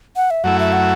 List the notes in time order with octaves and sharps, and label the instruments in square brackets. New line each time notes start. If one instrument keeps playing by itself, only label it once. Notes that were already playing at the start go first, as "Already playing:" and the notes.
[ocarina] F#5
E5
[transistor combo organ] F#2 F#3 A3 E4 [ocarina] F#5
[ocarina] E5
F#5